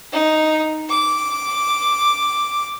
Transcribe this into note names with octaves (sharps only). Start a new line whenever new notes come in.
D#4
D6